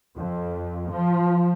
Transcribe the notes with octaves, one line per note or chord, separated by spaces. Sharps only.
F2
F3